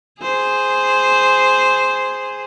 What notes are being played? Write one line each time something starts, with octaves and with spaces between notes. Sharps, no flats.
G#4 C5